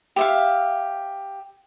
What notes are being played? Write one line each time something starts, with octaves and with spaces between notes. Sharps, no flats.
G4 E5 F5